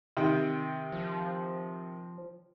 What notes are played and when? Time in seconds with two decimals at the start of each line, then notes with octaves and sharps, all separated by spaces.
0.17 C3 D#3 G5
0.92 F3